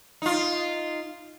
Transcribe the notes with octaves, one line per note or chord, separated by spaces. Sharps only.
D#4 F4